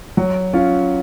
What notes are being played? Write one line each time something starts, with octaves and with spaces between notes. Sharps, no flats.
F#3
C#4 F4